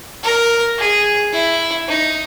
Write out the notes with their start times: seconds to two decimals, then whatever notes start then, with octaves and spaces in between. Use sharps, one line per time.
0.23 A#4
0.78 G#4
1.33 E4
1.88 D#4